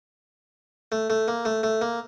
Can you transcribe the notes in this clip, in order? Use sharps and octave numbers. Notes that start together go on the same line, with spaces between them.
A3
A3
A#3
A3
A3
A#3